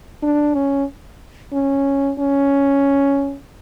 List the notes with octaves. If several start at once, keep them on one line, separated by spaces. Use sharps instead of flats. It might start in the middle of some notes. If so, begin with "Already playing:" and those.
D4
C#4
C#4
C#4